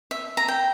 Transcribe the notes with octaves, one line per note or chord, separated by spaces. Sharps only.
E5
A#5
G5